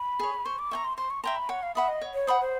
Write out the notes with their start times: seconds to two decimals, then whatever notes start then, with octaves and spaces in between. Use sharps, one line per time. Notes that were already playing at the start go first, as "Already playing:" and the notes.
Already playing: B5
0.19 G#4 C#5
0.45 C5 C#6
0.59 D6
0.71 E5 G5 A#5 C#6
0.84 C6
0.98 C5 C6
1.10 C#6
1.23 E5 G5 A#5 C6
1.36 B5
1.49 C#5 F#5
1.63 F5
1.75 E5 F#5 B5 D#6
1.88 D#5
2.01 C#5
2.14 C#5
2.27 C5 F#5 B5 D#6
2.41 C5